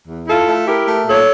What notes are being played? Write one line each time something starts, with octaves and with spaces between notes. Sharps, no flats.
E2
E4 F4 A4
A3
E4 G4 A#4
A3
A#2 A4 C#5